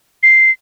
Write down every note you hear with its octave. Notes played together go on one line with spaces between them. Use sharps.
C7